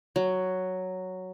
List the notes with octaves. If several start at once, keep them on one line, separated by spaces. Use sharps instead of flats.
F#3